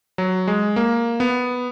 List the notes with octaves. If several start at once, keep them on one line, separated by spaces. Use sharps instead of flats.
F#3
G#3
A#3
B3